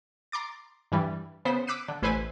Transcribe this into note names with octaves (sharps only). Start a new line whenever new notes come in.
A#5 C6 D6 A6
G2 E3 G3
C#3 B3 C5 B6
D6 E6 F#6 B6 C7 D#7
D3
A1 E4 B4 C5 G#5 D#7